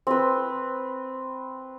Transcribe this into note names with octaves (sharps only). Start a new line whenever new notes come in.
C4 B4